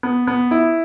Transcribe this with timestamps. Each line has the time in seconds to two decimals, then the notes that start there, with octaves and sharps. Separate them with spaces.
0.03 B3
0.27 B3
0.51 E4